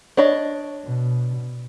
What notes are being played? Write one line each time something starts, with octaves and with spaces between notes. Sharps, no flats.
D4 C#5 D#5
B2